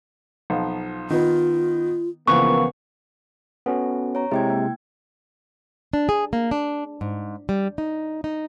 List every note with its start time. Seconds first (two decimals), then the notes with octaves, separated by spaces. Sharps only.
0.50 B1 F3 F4
1.10 D#3 B3 F4
2.28 C#2 E3 F3 A#3 B3 C#6 F#6
3.66 B3 C#4 F#4 A4
4.15 C#5 A#5
4.31 C3 G#3 E4 G5 G#6
4.50 A#3
5.93 D4
6.09 G#4
6.33 A#3
6.51 D4
7.01 G#2
7.49 G3
7.78 D#4
8.24 D#4